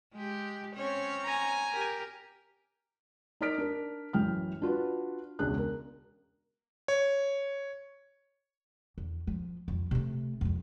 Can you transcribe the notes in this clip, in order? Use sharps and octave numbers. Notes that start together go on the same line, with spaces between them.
G#3 G4
C4 C#4 C#5
G#5 A#5
G4 A#4
D#4 A#4 D5 F6 B6 D7
D4 A#4
A1 F#2 E3 G5 F6
D4 F4 F#4 B4
E1 C#2 C#3 G#3 D4 F#6
A#4
C#5
E2
F3
C2 F2
C3 A3
C2 F2